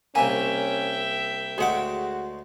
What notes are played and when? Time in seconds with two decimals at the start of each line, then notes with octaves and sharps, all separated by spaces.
0.15 C2 A#3 C#4 E5 G5 G#5
1.58 D2 G#3 F#4 G#4 F#5 D6